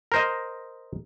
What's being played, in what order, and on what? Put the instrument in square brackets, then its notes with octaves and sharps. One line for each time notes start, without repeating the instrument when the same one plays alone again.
[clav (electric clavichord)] A#4 C5 D#5